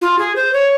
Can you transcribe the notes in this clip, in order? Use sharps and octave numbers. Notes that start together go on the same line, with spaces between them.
F4
G#4
C5
C#5